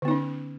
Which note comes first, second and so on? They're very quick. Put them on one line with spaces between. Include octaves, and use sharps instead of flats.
D3 B3 D#4 C#4